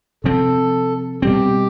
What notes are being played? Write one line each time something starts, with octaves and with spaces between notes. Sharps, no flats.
C3 F3 C4 A4
B2 G3 C4 G4